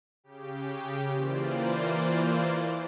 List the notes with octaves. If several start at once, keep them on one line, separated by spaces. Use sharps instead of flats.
C#3 G4
E3 A#3 F4 C5 D5